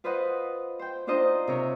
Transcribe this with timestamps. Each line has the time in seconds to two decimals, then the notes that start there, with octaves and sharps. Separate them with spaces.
0.04 F4 B4 C5 D#5 F#5
0.79 C5 G5
1.07 D4 D#4 F4 C5 D#5 A#5
1.48 C3 A#4 C#5